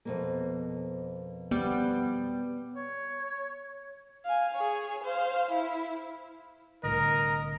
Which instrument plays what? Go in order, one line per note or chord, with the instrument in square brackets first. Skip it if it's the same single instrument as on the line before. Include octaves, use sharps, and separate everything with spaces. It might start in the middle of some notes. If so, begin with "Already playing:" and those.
[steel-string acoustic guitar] F2 B2 A#3
[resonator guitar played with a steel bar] G3 [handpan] B3
[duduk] C#5
[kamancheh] F5 G#5
G#4 C#5
C5 F5
E4
[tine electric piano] C2 A2 D3 [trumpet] A#4 [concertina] D#5